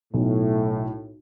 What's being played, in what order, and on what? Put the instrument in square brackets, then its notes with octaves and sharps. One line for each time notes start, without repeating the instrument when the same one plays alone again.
[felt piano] B1 [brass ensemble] A2